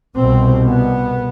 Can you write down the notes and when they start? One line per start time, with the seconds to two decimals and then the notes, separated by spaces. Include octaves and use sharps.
0.17 C2 B2 C4
0.68 B3